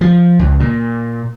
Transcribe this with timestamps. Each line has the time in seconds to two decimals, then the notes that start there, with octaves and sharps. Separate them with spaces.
0.01 F3
0.39 C#2
0.60 A#2